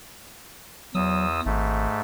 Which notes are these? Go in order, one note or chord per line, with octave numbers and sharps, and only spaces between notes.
E2 F#3 D#6 E6
G#1 G#2 A3